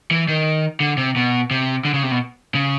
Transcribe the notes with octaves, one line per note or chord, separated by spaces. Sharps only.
E3
D#3
D3
C3
B2
C3
D3
C#3
C3
B2
C#3